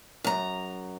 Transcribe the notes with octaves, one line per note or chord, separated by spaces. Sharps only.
F#2 A#5